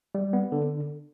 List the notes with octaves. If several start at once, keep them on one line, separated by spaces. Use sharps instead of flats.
G3
B3
D3